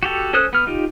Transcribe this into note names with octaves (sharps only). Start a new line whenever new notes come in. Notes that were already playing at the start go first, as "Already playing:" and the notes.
F#4 G4 A4
C#4 A4 C5 D#6 F#6
B3 F6
D#4 F4 G4